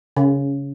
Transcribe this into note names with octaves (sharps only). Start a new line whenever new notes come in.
C#3